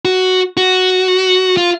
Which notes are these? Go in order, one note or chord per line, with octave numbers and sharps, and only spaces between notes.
F#4
F#4
F4